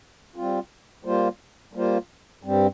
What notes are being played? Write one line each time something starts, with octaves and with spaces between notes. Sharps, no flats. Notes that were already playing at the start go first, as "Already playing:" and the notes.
G3 C4 F4
G3 A#3 F4 C5
G3 A#3 F4 C5
G2 G3 C4